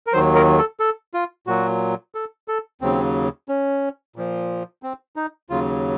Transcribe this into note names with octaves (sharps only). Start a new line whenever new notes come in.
A#4
D#2 D#3 F#3 C5
A#4
A4
A4
F4
A#2 F#3 F#4
A4
A4
D#2 C#3 F#3 C4
C#4
A#2 F3
C4
D#4
D#2 C#3 F#3 F4